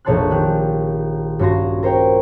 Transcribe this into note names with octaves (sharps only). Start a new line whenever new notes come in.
F1 A#1 C#5 A5 C6 F#6
D#3 G4 F#6
G2 C#4 F#4 C6 A#6
A#4 C5 C#5 G5